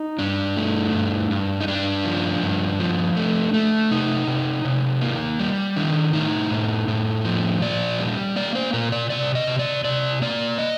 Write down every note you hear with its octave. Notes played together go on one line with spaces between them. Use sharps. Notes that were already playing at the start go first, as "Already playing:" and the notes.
Already playing: D#4
G2 D4
A3
G2
G2
D#4
G2 D4
F3
G2
F3
A3
A3
C3 D#4
C3
C3
A#3
G3
D#3 D4
A2 D#4
A2
A2
F3
A#2 D5
G3
A#3 D5
C5
A#2 A#4
D5
C3 D5
D#5
C3
D5
C3 D5
A#3 D5
D#5